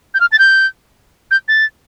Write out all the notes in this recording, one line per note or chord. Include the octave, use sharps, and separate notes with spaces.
G6
F6
A6
G6
G6
A6